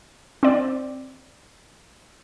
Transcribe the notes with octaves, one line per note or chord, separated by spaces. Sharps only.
C4 D5